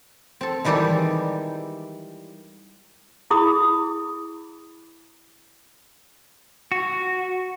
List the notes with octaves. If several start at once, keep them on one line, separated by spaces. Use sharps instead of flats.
C4 A4
D#3 E3 G3 G#3 G4 A4
E4 G#4 B5 D#6
F#4